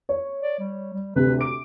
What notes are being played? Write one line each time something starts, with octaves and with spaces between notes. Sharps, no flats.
C#5
D5
G3
G3
D2 C3 B4
D6 D7